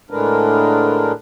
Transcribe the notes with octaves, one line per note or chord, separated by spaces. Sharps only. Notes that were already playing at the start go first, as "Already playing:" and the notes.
A2 D3 G#3 D4 A#4 B4